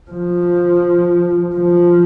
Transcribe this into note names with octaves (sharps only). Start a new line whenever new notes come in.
F3
F3